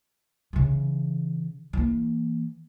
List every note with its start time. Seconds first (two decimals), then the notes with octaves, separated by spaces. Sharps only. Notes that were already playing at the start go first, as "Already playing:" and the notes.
0.53 C#3 E3
1.73 E3 A#3